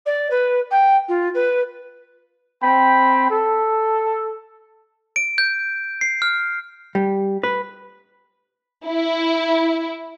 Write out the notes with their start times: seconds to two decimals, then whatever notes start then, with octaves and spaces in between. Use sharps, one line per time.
0.06 D5
0.30 B4
0.71 G5
1.08 F4
1.34 B4
2.62 C4 G5 B5
3.30 A4
5.16 D7
5.38 G6
6.01 C7
6.22 F6
6.95 G3
7.43 B4
8.86 E4